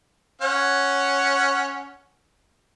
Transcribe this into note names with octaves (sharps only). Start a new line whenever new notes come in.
C#4 C#5 F#5